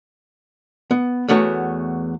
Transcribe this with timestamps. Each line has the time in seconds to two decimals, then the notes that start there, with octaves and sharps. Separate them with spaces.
0.91 B3
1.28 E2 A3 B3 F#4 C#5